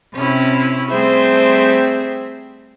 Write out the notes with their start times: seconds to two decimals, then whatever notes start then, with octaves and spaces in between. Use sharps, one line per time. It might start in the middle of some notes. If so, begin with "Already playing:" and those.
0.13 C3 C#4 E4
0.89 G3 A3 C4 G#4 C5 E5